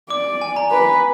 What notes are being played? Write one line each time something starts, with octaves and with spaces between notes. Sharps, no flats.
D5 D6
G#5
A#5
B4